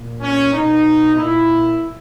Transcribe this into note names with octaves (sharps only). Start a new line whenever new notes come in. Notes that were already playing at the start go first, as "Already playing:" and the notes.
Already playing: A#2
C#4
B2 D#4
A#2 E4